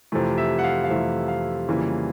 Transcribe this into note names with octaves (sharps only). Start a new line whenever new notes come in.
F2 C3 E3 A3
E5
F#5
F5
F5
F2 C3 E3 A3 E5
F5
F2 C#3 E3 G3 A#3